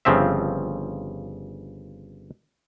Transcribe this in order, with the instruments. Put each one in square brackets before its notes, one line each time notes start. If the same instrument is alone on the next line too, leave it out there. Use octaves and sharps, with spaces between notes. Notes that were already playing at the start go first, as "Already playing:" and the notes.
[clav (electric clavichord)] G1 C#3 F3 C4 E5